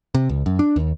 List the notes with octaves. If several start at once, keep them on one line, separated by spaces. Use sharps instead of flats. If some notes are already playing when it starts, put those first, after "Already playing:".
C3
C#2
F#2
D4
D#2